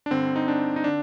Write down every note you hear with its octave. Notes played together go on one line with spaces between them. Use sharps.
D4
G2 D3 C4
D#4
D4
D#4
D3 D4